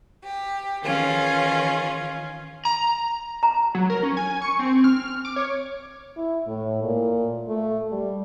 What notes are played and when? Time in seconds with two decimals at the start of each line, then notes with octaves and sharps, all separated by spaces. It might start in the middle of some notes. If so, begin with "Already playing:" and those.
0.23 G4
0.84 D#3 E3 C#4 F4 G#4
2.65 A#5
3.43 A#5
3.75 F#3
3.90 A#4
4.03 C#4
4.17 G#5
4.42 C#6
4.59 C4
4.84 F6
5.25 D6
5.36 C#5
6.17 E4
6.47 A2
6.83 A#2
7.48 A3
7.92 G3